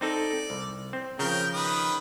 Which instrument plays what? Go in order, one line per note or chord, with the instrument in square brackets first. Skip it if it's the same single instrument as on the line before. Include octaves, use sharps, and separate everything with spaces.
[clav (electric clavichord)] C4 D#4 A4 [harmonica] D5
[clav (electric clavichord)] C2
C4
[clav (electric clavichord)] C#3 F3 [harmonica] A#4 G5
[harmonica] D#3 B4 D#6